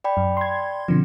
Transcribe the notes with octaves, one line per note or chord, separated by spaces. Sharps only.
D5 G5 B5
F#2
C6 G#6
B2 D3 F3 C4